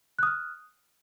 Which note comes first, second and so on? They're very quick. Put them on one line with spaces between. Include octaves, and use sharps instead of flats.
F#6 D#6 F6